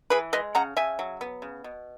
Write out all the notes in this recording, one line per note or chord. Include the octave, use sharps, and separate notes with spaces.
E3 G#4 B4
G#3 B4 D#5
C#3 F#5 A#5
C#3 E5 G#5
F#3
B3
C#3
B2